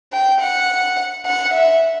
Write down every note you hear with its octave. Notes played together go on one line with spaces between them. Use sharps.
G5
F#5
F#5
E5